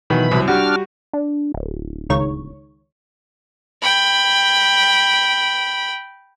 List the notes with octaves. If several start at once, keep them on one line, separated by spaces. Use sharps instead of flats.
B2 D#3 E3 F#3 B5
C2 F#2
G3 D4 F#4 F6
D4
D1
C#2 D#3 C#5
G5 B5